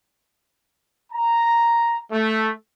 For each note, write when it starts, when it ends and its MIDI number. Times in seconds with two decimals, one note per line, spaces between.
1.13 2.00 82
2.12 2.52 57